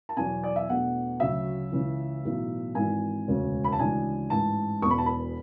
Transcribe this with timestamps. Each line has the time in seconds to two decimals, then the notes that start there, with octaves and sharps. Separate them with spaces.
0.09 A5
0.17 E2 B2 F#3 G#5
0.44 D5
0.56 E5
0.69 E2 B2 A3 D4 F#5
1.20 D2 C#3 F#3 C#4 E5
1.72 C#2 C#3 E3
2.23 B1 A2 E3
2.75 G#1 G#2 E3 G#5
3.28 E1 D2 C#3 G#3 C#4
3.64 B5
3.72 A5
3.79 D2 C#3 E3 G#3 D4 G#5
4.30 A1 G#2 G#3 A5
4.82 E1 E2 B2 C#6
4.90 B5
4.98 A5
5.06 B5